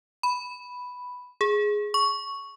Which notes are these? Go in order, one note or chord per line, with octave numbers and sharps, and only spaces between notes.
B5
G#4
C#6